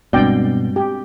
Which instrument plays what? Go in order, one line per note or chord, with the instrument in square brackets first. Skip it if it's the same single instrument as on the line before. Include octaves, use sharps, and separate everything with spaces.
[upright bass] G2 G#3 [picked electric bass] B2 [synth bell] C4 D4 G7 [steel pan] D5 G5
[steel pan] G4